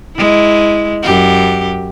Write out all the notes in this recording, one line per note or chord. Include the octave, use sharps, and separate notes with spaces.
G#3 E4
F#2 G4